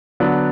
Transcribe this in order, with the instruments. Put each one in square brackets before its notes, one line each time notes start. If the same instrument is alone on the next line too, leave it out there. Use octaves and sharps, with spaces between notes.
[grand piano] D3 F#3 B3 D4